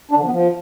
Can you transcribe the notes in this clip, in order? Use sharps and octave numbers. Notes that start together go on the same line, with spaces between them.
D4
D3
F3
B3
F3